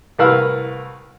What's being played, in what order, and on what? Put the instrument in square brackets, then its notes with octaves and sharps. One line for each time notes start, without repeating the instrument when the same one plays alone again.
[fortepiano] C2 A2 A#4 B4 F5 E6